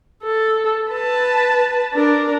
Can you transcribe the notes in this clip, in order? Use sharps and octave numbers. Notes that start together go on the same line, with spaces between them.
A4
B4 A5
D4 A#4